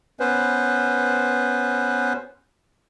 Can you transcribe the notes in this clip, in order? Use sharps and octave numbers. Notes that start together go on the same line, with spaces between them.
B3 C#4 B4 C5